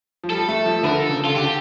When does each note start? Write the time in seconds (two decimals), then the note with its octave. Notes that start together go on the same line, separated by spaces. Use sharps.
0.24 F3
0.30 G3 A4
0.48 A3
0.66 F3
0.83 D3 A#4
1.00 A4
1.09 C#3
1.25 F4
1.35 D3 G4